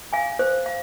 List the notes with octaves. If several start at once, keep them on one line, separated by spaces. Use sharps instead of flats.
F5 G#5
C5
F5